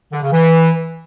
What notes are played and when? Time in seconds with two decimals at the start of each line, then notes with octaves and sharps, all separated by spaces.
0.13 D3
0.22 C#3
0.32 E3